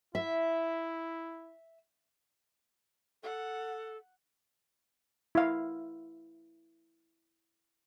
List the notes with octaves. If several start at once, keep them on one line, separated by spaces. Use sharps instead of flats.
E4 E5
A4 F#5
E4 F5